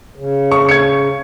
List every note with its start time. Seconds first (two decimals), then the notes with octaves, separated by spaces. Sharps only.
0.16 C#3
0.52 C#6
0.69 G#6 C#7